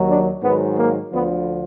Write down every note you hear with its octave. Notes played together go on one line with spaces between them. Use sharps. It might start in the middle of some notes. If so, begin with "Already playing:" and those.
Already playing: D#2 D#3 F#3
D4
G#2 D#3 F#3 B3
A#3
D2 D3 F3 B3